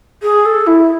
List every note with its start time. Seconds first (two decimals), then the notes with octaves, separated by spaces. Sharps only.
0.22 G#4
0.45 A4
0.66 E4